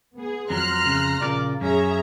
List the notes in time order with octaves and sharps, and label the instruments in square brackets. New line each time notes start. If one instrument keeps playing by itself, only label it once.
[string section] B3 G#4
[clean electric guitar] F2 F#3 [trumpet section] A#5 [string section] C6 F6 F#6
[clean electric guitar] F2 C#3
[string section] A#1 [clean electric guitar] C#3 F4 A#4 [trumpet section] D5
[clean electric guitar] F#2 [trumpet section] C#4 [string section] G#4 E5 A#5